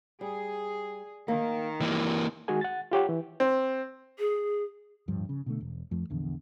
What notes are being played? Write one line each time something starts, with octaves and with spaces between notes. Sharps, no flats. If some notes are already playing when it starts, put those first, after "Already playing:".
G3 G#4
D#3 A#3
E3 G3 A#3
D#3 G#3 F#4 G#4 G#5
F#5 A6
F4 G4 C#5 F#5
E3
C4
G#4
D1 G2 F3
C#3
B2 D3 A3
E1
F2 F3 A3
A#1 E2 D3